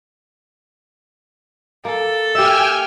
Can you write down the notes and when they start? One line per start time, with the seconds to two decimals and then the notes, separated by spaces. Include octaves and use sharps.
1.85 A#3 A4
2.35 G4 E5 G5 G#5 E6 F6